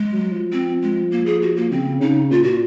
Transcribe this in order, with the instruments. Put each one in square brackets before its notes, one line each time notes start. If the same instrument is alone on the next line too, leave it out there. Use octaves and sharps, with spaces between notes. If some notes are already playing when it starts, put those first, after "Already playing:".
Already playing: [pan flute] G#3
[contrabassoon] F#3
F3
[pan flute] C4
G#3
A#3
G#4
F#4
A#3
[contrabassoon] C#3 [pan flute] C4
[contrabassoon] C#3 [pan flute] D#4
[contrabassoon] A#2 [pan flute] F4
[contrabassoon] A#2 [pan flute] F#4